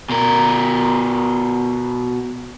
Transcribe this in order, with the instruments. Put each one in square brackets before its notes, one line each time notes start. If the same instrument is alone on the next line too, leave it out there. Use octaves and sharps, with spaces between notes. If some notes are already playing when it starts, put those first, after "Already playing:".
[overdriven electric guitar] B2 A#4